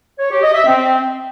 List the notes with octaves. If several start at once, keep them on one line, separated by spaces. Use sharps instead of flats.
C#5
G4
D#5
E5
C4